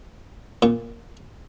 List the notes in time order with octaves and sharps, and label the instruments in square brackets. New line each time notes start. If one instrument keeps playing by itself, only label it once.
[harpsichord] A#2